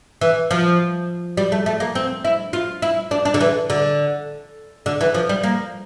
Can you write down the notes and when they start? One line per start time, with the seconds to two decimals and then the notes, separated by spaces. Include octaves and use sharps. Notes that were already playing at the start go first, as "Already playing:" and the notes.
0.21 E3
0.51 F3
1.37 G3
1.52 A3
1.66 A3
1.80 A#3
1.95 C4
2.24 E4
2.53 F4
2.82 E4
3.11 D4
3.25 D4
3.34 D3
3.40 E3
3.70 D3
4.86 D3
5.01 E3
5.14 F3
5.29 G3
5.43 A#3